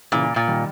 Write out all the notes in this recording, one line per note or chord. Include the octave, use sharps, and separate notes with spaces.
A#2 C#3 E3
A#2
D#3 G3